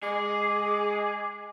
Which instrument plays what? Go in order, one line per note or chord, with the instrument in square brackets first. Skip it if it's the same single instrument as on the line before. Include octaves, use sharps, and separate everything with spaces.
[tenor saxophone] G#3 [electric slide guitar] G#4 [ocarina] D6